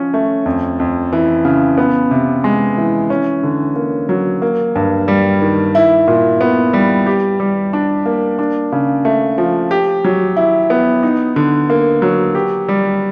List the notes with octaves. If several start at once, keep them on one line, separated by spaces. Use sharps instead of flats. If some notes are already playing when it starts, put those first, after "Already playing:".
Already playing: F3 C#4
A3
F2
F2
E3
C#3
B3
C3
G#3
E3
C#4
D3
A#3
F#3
A#3
G2
G3
D#3
E4
A#2
B3
G3
G4
G3
D4
A#3
D4
C#3
A3
F3
G4
F#3
E4
B3
D#4
D3
A#3
F#3
G4
G3